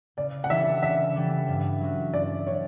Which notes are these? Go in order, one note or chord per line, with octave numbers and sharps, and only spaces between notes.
C#3 D5
F#5
E3 G3 D4 A4 E5
C#3 E5
E3 G3 D4 A4
G2
F#3 C#4 F#4
G2 D5
F#3 C#4 F#4 C#5